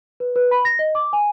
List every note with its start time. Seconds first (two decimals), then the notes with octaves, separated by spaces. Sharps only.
0.20 B4
0.36 B4
0.51 B5
0.65 A#6
0.79 D#5
0.95 D6
1.13 G#5